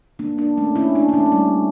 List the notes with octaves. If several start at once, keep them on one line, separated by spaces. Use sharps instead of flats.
A#3 D4
A#3 D4
A3 C#4
C#4 E4
A#3 D4
D4
A3 C#4
C#4
G3 A#3